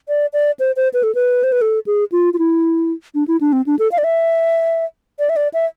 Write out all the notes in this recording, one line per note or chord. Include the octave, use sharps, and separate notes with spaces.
D5
D5
C5
C5
B4
A4
B4
C5
B4
A4
G#4
F4
F4
E4
D4
E4
D4
C4
D4
A4
F5
D5
E5
D5
E5
D5
E5